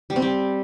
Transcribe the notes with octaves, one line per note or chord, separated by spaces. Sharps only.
G3
C4
G3